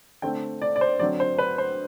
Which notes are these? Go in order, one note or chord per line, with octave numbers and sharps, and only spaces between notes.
D3 A3 C4 G5
D5
D5
C5
D3 F#3 C4 D5
C5
B4
C5